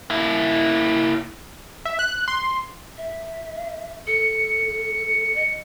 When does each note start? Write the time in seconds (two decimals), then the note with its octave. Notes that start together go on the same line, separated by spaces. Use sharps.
0.10 A#3 E4
1.85 E5
1.99 F#6
2.28 C6
2.97 E5
4.07 A4 C#7
5.35 D#5